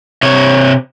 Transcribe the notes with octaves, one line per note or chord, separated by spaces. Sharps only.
C3 C#5